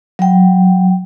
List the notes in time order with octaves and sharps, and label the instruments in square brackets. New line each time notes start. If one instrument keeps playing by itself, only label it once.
[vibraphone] F#3 G5